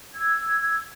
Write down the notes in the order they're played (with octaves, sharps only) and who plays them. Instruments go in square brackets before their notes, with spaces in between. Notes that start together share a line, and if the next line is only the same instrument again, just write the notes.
[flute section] E6 G#6